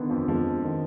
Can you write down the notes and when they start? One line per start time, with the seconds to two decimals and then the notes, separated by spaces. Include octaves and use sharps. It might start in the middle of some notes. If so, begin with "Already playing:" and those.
Already playing: D3 D#3 B3
0.10 F2 F3
0.28 F2 F3 G#3
0.64 D#3